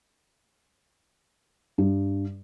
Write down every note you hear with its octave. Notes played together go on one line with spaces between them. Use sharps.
G2